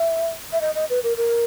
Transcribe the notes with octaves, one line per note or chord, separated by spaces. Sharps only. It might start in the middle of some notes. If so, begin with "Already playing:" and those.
Already playing: E5
E5
D#5
D#5
B4
A#4
A#4